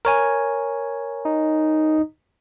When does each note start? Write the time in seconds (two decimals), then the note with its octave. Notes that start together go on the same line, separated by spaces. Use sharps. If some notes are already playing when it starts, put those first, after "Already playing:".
0.05 A#4 C#5 G#5
1.25 D#4